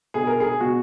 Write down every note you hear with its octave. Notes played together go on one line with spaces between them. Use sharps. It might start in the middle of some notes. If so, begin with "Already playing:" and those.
B2 G#4
A#4
G#4
B2 F#4